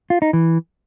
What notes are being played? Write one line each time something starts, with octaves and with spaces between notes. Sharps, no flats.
F4
D#4
E3